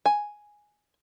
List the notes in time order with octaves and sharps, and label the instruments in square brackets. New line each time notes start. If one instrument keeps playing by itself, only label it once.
[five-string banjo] G#5